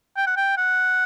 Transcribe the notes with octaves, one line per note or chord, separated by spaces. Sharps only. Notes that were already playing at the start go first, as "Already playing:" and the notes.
G5
F#5
G5
F#5